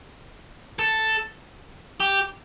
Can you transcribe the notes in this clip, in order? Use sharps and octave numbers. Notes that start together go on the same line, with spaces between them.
A4
G4